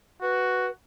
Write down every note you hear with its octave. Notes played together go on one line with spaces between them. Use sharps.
F#4 B4